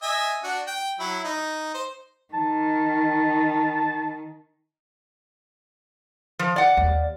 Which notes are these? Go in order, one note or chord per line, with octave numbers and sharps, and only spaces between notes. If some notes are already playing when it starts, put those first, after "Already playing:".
D#5 E5 G#5
D4 F#4
G5
F#3 E4
D#4
C5
D#3 A5
F3
D5 F#5
D#2